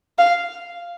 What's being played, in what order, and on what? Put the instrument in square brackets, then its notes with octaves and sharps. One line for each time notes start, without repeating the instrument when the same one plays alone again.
[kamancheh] F5